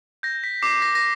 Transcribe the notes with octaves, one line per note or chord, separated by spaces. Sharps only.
G6 A#6
B6
D6 C7
A#6
A#6